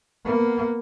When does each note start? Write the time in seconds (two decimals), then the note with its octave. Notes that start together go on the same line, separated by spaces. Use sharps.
0.25 A#3 B3